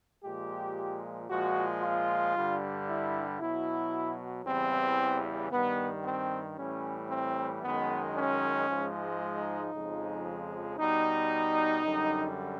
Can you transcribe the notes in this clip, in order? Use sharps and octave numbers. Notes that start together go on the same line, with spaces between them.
A#2 F3 G#3 G4
A#2 F3 G#3 F#4
F4
G2 D3 G3
E4
B2 F#3 E4
E2 C#3 E3 G3 C4
G2 D#3 G3 B3
C4
A2 E3 G3 C#4
C4
F#2 D#3 G#3 B3
C#4
G#2 F3 G#3
D#4
F2 C#3 F3 G#3
B2 G3 D#4
F#2 D3 G3